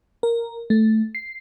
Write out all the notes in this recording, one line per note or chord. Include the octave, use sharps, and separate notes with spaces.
A#4
A3
C7